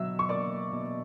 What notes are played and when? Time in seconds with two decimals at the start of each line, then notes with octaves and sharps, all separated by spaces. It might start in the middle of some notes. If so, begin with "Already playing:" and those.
Already playing: B2 F#3 E5 E6
0.19 C#6
0.29 A#3 D5 D6
0.73 B2